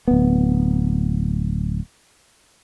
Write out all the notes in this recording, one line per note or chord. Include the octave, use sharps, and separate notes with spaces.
D1 B3